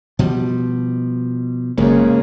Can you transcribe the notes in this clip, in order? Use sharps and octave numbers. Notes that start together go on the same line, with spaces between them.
B2 F3 G3
F#1 F2 C#3 G#3 A#3